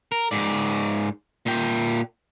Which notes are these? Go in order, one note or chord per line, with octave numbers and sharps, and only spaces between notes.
A#4
G#2 D5
A#2 G5